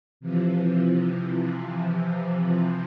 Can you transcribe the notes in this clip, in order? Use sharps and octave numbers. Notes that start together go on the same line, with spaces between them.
C3 E3 F3